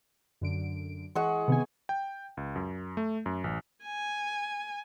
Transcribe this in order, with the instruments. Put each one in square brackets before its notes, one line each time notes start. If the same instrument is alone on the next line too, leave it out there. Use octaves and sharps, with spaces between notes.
[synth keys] F#2 D3 D7
[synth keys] E3 [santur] G#3 F#5 C#6
[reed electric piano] C3 D#3 [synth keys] B3 G#5
[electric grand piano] G5
C#2
F#2
A3
F#2
A1
[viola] G#5